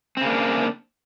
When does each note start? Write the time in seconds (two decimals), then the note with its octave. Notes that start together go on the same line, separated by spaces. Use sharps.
0.17 C4
0.21 C#3
0.25 A#3
0.29 D4